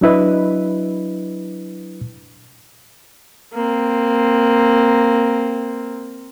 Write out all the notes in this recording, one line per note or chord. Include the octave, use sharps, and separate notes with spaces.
F#3 D4 E4 B4 D#5
A#3 C4